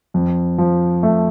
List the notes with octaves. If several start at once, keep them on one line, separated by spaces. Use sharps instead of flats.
F2
F3
A3